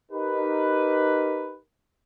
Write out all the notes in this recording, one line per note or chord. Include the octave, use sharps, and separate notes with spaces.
D#4 G4 A#4 B4